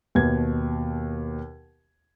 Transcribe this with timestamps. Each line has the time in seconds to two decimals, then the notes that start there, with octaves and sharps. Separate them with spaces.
0.15 D#2 B2 B4 G#6